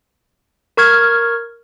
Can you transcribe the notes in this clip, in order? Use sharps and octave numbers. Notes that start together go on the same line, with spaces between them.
A#4 C#6 F6 G#6